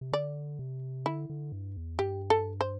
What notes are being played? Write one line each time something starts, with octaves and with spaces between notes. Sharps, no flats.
C3
D3 D5
C3
D3 E4
D3
G2
E2
G2 G4
A4
C5